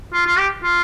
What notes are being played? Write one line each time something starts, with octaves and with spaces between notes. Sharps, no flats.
F4
F4
G4
F4